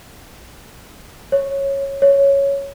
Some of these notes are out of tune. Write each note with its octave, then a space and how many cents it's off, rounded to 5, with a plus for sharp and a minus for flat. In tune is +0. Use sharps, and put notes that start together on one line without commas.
C#5 -10
C#5 +0